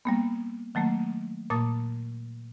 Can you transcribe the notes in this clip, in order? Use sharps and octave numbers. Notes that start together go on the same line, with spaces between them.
G3 A#3 B3
D#3 F#3 A3 A#3
A#2 A#3 A5 D#6 A6